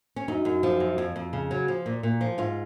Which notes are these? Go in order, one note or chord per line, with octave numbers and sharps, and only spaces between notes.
C#4
F#2 D#4
F#2
F3
F#2
F2
F2
C#3
F#3
F3
A#2
A#2
F3
G#2 F4